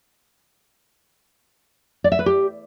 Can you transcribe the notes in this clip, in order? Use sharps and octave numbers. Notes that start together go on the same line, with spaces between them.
D5
E5
B4
G4